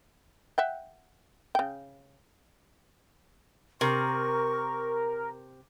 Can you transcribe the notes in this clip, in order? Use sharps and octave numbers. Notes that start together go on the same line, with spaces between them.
E5 F#5 G5
C#3 G5
C3 A#4 C#6